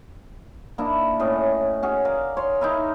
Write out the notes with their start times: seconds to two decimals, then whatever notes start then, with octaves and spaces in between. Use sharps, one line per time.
0.78 A#3 D4 E4 D#5
1.20 A2 C#4 D#5
1.83 C#4 F#4 G#4
2.05 A#4 D5 F5
2.37 C#5 C6
2.61 D#4 E4 A#4